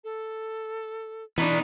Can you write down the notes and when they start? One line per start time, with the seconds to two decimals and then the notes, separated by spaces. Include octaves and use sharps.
0.04 A4
1.38 B2 E3 B3 D4 D#4 A#5